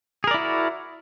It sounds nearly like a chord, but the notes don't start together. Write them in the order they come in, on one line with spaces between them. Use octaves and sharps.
G#4 A#4 D5 E4 F#4